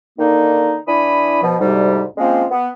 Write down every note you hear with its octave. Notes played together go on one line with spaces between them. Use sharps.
D3 D#3 A#3 D#4
E3 D4 E4 B5 D#6
B2 F3
D2 G#2 C3 G3
F3 G#3 A#3 C4 C#4
B3